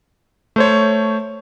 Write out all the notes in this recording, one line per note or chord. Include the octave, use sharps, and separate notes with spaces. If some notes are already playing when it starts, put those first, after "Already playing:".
A3 C5 C#5